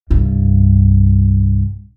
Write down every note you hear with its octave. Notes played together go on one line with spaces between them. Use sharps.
C2 G2